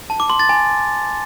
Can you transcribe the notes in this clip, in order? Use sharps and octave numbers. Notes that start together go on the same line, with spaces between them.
A5
D6
C6
A6
G#5